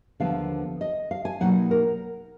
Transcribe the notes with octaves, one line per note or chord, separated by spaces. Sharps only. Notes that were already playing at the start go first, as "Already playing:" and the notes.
D#2 D3 F3 B3 F5
D#5
F5
G#5
B2 F#3 A#3 D#4 F#5
A#4